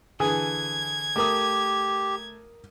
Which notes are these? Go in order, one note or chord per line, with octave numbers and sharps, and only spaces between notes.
D3 E3 G#4 G#5 D#6 G#6
A3 G4 A#4 D6 D#6